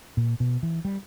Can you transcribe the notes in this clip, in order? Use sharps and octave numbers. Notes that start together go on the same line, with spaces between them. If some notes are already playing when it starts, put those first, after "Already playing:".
A#2
B2
E3
G3